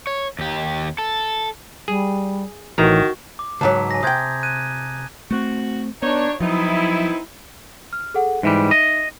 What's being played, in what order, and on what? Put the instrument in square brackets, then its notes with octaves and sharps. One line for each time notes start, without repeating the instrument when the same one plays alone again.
[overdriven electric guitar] C#5
D#2 G4
A4
[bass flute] G3 [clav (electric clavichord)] G#4
[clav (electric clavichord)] A1 E3 A#5 [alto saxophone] D#3 [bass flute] F#4
[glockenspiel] D6
[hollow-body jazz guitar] C#2 G#2 F#3 [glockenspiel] A5 A#5 B6
[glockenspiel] G#5 A#6
[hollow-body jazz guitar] C3 G5 [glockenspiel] D#6 G6 G#6
[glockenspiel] F#6 G#6 D#7
[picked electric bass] A3 B3 C4 [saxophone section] F#4
[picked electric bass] B3 [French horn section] D4 [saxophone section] D#4 F#4 C#5
[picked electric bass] F3 F#3 [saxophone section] B3 C4 D#4 [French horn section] E4
[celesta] F6
G#4 A4 F#5
[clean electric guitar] G#2 E3 G3 [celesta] D#4 E5 B6
[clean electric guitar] D#5